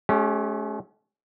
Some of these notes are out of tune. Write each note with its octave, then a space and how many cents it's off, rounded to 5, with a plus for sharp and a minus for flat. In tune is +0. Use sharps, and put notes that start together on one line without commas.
A3 -45 C#4 +0 G4 +0